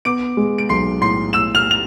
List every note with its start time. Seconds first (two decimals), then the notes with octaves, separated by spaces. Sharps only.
0.05 B3 D6 D7
0.37 G#3
0.58 D7
0.69 B1 C6 C7
1.01 A2 C6 C7
1.33 A2 E6 E7
1.55 F6 F7
1.71 F7